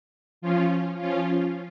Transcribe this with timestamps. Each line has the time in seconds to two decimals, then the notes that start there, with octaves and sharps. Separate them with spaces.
0.41 F3 C#4 F4
0.98 F3 C#4 F4